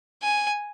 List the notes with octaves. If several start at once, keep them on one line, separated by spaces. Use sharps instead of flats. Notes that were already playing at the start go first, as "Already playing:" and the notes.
G#5